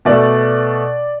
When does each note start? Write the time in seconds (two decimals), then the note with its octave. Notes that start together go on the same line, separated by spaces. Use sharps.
0.05 B2 A3 D5